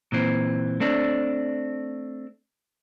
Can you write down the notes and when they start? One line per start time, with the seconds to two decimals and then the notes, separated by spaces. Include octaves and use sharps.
0.12 A#2 E3 C4
0.80 A3 C4 D4